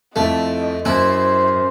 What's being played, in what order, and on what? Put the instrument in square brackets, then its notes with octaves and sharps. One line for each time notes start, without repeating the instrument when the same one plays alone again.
[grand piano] F2 E4 [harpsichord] A3 [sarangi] D#5
[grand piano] F#2 [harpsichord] E4 [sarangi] C5